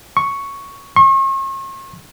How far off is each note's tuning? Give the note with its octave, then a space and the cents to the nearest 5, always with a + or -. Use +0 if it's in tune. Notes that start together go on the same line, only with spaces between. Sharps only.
C#6 +5
C#6 -40